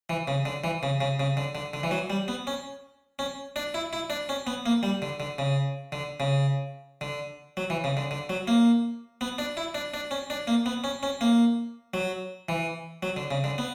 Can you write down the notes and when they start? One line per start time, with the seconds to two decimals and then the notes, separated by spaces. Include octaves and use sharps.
0.10 E3
0.28 C#3
0.45 D3
0.64 E3
0.83 C#3
1.01 C#3
1.20 C#3
1.37 D3
1.55 D3
1.74 D3
1.83 E3
1.91 F#3
2.10 G3
2.28 B3
2.47 C#4
3.19 C#4
3.56 D4
3.74 E4
3.93 E4
4.10 D4
4.29 C#4
4.47 B3
4.66 A#3
4.83 G3
5.02 D3
5.20 D3
5.38 C#3
5.92 D3
6.20 C#3
7.01 D3
7.57 F#3
7.70 E3
7.84 C#3
7.97 D3
8.11 D3
8.29 F#3
8.48 A#3
9.21 B3
9.38 D4
9.57 E4
9.74 D4
9.94 D4
10.11 C#4
10.30 D4
10.47 A#3
10.66 B3
10.84 C#4
11.03 C#4
11.21 A#3
11.94 F#3
12.49 E3
13.03 F#3
13.17 D3
13.31 C#3
13.44 D3
13.58 B3